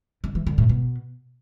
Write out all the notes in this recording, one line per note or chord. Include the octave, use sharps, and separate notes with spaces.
D3
E3
D3
A2
B2